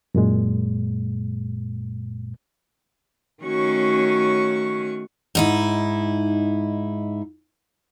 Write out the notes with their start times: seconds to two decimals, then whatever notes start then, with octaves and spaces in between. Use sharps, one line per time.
0.15 F#2 A#2 G#3
3.44 D#3 A3 C#4 F#4 C#5 C#6
5.35 G#2 D#4 E4